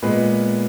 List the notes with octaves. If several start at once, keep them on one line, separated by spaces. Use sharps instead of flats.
A#2 G#3 B3 B4